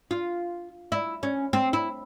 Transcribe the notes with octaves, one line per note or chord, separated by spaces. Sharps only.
F4
E4
C#4
C4
E4